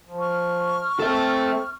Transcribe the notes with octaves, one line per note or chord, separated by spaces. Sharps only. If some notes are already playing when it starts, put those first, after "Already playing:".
F3
C#6 F6
C4 A4 E5